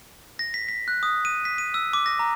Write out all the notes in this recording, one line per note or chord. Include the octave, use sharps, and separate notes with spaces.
A#6
B6
B6
F#6
D#6
D#7
B6
D#7
E6
D6
A#6
A#5